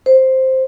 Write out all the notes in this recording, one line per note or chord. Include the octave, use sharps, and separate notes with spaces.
C5